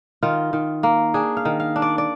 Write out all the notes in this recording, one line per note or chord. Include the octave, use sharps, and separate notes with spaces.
D#3 F4
D#3
A#3
D4 G#4
F5
D#3
F5
D4
D5
D5